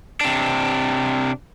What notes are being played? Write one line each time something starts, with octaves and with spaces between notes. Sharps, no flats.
C3 D4